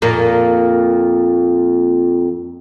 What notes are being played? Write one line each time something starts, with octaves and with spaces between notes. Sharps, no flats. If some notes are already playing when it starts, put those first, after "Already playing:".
F2 A#2 A#3